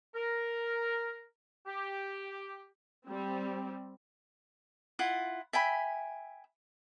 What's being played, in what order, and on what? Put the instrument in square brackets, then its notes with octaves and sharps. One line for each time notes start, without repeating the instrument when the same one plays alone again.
[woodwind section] A#4
G4
[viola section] G3 C4
[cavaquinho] E4 F4 F#5
E5 G5 G#5 B5